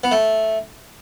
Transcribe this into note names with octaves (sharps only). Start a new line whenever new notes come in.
B3
A3